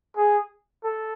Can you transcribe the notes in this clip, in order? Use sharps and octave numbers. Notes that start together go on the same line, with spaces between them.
G#4
A4